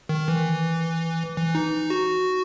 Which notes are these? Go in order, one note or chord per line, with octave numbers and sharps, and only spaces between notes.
D#3
E3
E3
D#4
F#4